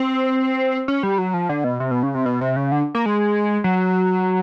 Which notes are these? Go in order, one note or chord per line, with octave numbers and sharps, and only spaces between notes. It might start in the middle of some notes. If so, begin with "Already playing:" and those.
Already playing: C4
C#4
G3
F#3
F3
D3
B2
C3
B2
C#3
C3
B2
C3
C#3
D3
A#3
G#3
F#3